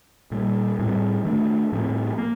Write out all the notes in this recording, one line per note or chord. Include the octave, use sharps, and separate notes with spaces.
A#2 G3 A#3
A2 G3 C4
D#3 A3 D4
A2 F3 C4
A#3